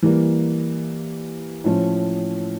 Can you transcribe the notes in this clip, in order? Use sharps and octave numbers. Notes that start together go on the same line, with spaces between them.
E3 G3 A#3
A2 F3 C#4